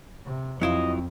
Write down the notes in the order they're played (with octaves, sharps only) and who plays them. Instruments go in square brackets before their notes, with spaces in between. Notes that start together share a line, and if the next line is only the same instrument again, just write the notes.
[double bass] C3
[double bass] F2 [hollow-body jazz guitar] F#3 E4 F4 [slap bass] C4 [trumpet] D#5